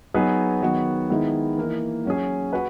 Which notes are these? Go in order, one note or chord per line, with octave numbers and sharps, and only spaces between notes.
F#3 B3 D#4 G#4 B4
D#3 F#3 B3 F#4
D#3 G#3 B3 E4
E3 A#3 D#4 A#4
F#3 C#4 G#4
F#4 B4